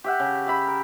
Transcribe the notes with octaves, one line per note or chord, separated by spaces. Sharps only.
G4 E5 F#5
C#3
G4 E5 B5
A#4